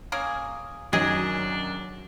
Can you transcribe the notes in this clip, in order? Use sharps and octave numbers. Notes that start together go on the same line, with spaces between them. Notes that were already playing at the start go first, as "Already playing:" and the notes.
A#3 C#4 G#4
F#2 D#3 F#3 D4 G#4 D#5